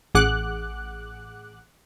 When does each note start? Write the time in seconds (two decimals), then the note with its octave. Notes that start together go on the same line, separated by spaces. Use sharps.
0.15 A1 G#4 F#5 D6 F#6